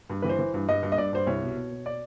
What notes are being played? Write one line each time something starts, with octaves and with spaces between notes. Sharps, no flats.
G2
E3 B4
C5
E3
G2
G2 D#5
G2
D#5
G2 D5
G2 C5
C2 C#5
B2
B2
B2
D5